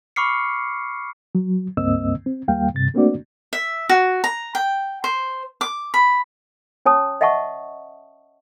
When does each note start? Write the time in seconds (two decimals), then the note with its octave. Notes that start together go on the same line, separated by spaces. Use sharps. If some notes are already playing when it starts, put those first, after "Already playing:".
0.16 B5 C#6 D6 F6 C7 C#7
1.35 F#3
1.77 C#2 G2 A#3 C4 D#5 E6
2.26 C4
2.48 D#2 G3 A#3 F5 G5
2.74 G2 C3 A6
2.94 A3 A#3 C4 D4 F#4 D5
3.53 E5
3.89 F#4
4.24 A#5
4.55 G5
5.04 C5
5.61 D6
5.94 B5
6.86 C#4 C#5 A5 D#6
7.21 D#5 E5 F#5 A5 C#6